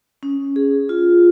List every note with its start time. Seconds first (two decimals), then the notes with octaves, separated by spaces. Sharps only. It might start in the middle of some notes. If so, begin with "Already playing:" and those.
0.23 C#4
0.56 G#4
0.89 F4